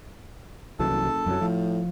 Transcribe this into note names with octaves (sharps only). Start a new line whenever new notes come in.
F#1 C2 E3 F#3 A4 A5
C2 F#2 F#3
A2 F3